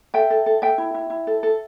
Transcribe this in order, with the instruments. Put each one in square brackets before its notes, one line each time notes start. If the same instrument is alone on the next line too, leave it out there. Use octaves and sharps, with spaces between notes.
[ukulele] A4 E5 G5
A4
A4
A4 E5 G5
E4
E4
E4
A4
A4